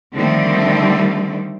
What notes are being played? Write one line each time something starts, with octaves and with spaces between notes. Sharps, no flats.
D3 D#3 F3 G3 A3 C4